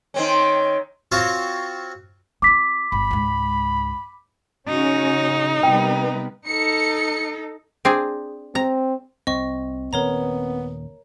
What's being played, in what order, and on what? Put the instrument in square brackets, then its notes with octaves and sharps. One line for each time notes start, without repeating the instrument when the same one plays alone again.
[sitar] D#3 C4 C#4
[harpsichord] C4 F4 F#4 C#5
[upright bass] C4 F4 [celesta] D6 B6
[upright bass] G1 [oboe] B5
[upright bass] C#2 G#2
[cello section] C#3 F#4 [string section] C#4 [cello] D#4
[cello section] C3 G3 [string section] B3 A#4 B4 [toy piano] G5
[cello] D#4 A4 [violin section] C#7
[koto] C4 D4 G#4
[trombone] C4 [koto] A#5
[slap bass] C2 [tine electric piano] C4 [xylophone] D#5 C#6
[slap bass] D#1 D#3 A#3 [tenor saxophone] B3 [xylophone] A#4 C#5 A#5